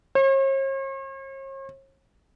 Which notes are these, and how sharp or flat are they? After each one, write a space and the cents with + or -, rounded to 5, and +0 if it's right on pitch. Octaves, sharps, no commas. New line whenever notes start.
C#5 -45